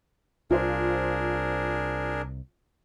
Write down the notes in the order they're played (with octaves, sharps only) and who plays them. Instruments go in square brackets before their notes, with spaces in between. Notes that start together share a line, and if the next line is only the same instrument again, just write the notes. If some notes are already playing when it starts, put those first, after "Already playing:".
[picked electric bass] C2 [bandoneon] D4 G#4 A#4 [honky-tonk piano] F4 C5